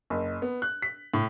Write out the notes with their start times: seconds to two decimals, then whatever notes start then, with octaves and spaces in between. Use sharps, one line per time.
0.10 F#1
0.42 B3
0.62 F#6
0.82 B6
1.14 A2